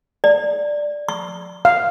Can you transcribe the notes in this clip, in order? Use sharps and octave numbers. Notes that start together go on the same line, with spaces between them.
D5
C#6
F5